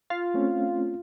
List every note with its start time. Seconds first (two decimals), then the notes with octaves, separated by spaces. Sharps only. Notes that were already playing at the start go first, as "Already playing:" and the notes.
0.10 F4
0.34 A3 C4 C#4